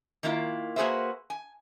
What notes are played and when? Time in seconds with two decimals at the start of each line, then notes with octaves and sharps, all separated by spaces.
0.23 D#3 A#3 E4 F4
0.76 A#3 F#4 G#4 B4 C5 E5
1.30 G#5